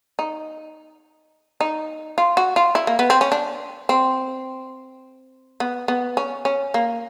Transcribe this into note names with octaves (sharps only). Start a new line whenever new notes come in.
D#4
D#4
F4
F#4
F4
E4
A#3
B3
C4
C#4
D4
C4
B3
B3
C#4
C#4
A#3